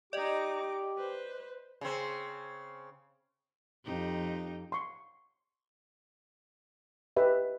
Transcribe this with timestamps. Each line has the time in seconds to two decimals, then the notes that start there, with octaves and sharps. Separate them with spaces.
0.13 D#4 G4 D5 D#5 D6
0.97 B4 C5
1.81 C#3 C4
3.85 F2 D#4 G4
4.72 C6 C#6
7.16 G4 B4 D#5 E5